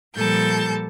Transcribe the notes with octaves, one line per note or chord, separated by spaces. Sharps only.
A#2 F3 G3 A4 A5 G6